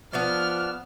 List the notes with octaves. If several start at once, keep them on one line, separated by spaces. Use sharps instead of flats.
F3 B3 D4 D5 F6